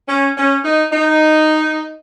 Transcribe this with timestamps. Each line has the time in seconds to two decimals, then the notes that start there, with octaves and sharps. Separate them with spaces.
0.08 C#4
0.37 C#4
0.64 D#4
0.92 D#4